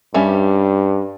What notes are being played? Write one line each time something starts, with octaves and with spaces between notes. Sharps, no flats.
G2 G3 C#4 E5